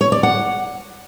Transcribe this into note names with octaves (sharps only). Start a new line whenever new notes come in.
C#5
D5
F#5